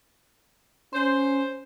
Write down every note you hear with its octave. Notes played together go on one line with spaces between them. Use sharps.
C#4 C5